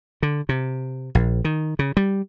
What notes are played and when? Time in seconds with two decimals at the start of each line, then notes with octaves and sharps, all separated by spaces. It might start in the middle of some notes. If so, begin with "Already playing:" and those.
0.23 D3
0.49 C3
1.15 A#1
1.45 D#3
1.79 C#3
1.97 G3